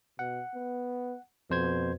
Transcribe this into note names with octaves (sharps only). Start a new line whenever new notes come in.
B2 F#5
B3
F2 B2 C5 G#6